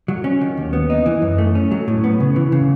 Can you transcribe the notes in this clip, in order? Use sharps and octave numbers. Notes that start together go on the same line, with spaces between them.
F#3
C#4
D#3
D#2
B3
D#4
E3
F#2
A3
C#4
F#3
A2
B3
C#3
E3
C#3